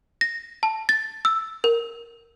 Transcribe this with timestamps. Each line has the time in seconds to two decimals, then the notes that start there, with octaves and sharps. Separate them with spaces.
0.21 A#6
0.63 A5
0.89 A6
1.25 E6
1.64 A#4